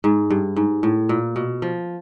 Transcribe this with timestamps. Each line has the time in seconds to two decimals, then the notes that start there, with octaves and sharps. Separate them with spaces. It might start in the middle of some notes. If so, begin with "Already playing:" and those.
0.04 G#2
0.30 G2
0.56 G#2
0.83 A2
1.09 A#2
1.36 B2
1.62 F3